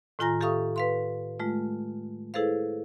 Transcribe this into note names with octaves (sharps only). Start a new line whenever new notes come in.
A2 D#3 F4 G#5 A#5 A#6
G4 A4 E5 F5 C#6 D#6
B4 F5 C6
G#3 A3 F4
E4 G#4 A4 B4 C5 F5